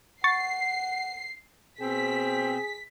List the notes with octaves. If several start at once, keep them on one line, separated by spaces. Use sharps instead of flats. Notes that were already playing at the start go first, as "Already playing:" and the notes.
F#5 C#6 A6 C7
B2 C4 G#4 B6